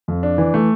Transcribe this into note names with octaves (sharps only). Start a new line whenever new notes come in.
F2
D4
E3
A3